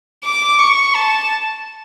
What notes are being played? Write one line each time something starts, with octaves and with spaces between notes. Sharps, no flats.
D6
C#6
A5